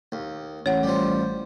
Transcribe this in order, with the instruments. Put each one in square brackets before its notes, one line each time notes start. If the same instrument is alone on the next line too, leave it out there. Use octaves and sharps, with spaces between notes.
[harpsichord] D#2
[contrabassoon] A1 [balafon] C#5 F#5
[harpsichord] F3 G3